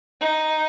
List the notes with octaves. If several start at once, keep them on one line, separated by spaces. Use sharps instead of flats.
D#4